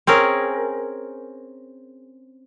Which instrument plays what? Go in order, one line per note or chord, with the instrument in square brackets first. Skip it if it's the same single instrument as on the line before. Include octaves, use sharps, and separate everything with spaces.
[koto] C4 C#4 G#4 A#4